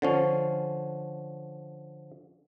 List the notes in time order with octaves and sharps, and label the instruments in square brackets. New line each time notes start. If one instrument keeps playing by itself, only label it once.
[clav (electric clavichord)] D3 F3 C#4